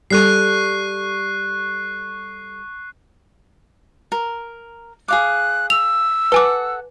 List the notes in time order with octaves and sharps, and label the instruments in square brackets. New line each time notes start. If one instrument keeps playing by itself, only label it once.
[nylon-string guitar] G3 A4 [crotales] C#6 F#6 C7
[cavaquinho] A#4
[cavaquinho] G#4 F5 D6 [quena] F#6
[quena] E6 [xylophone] F7
[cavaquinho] A4 F#5 [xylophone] B4 G#5 D6